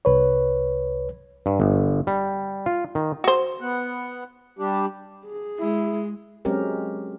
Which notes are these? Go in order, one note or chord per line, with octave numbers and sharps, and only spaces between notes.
C2 B4 C#5
G2
G1
G3
F4
D#3
F#4 C5
B3 F#5
G3 D4 G4
G#4
G#3 E4
F#3 G#3 C4 C#4 G4 A#4